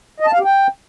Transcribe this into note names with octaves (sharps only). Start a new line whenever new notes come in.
D#5
A5
F5
G4
G5